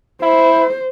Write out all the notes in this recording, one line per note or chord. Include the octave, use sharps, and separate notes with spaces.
E4 C5